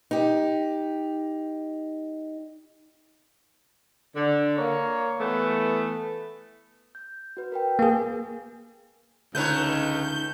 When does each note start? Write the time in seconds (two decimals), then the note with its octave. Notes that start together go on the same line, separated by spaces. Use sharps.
0.11 D#4 G4
4.16 D3
4.58 A#3 C#5
5.20 E3 A3 B3
6.95 G6
7.37 F#4 B4
7.52 A#4 B4 G5
7.79 A#3 G#4
9.35 C#2 D3 A3 D#4 B4 C#5 G6